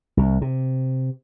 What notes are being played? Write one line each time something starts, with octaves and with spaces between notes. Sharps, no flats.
C2
C3